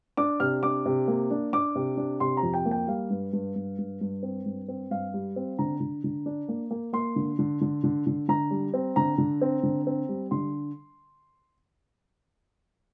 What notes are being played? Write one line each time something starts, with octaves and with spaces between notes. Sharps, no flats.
D4 D6
C3 F6
D4 D6
C3
A#3
D4
D4 D6
C3
D4
C3 C6
A#5
F2
G5
A#3
G5
G3 F5
G2
G2
G2
G2
G2
C4
G2
C4
G2 F5
G3
C4
D3 A#5
D3
D3
D4
A#3
A#3
A#3 C6
D3
D3
D3
D3
D3
D3 A#5
G3
C4
D3 A#5
D3
C4
D3
C4
G3
D3 C6